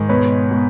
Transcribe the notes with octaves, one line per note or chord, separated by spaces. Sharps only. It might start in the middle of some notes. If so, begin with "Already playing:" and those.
Already playing: G#2 D#3
B2 B4 C#5
B2